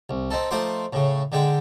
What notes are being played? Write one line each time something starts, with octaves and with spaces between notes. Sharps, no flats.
C2
C4 D#4 A4
F3 A3 D#4 C5 C6 D6
A2 C#3
D3 G#3 D4 G5